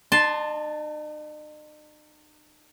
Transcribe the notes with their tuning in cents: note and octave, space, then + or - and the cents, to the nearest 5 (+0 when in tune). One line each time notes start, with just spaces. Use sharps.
D#4 -45 A5 +0 C6 +0